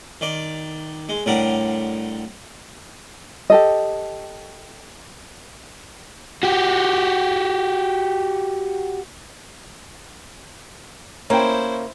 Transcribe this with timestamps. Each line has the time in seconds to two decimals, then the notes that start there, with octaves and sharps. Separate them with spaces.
0.21 D#3 D5
1.09 G#3
1.26 A2 D3 G3 A#4 F#5
3.50 G4 A4 D#5
6.43 F#4 G4
11.30 A#3 C#4 E4 C5 G5